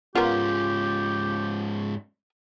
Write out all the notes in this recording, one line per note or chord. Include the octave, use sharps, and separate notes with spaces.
G#2 B3 C#4 F4 G4 A#4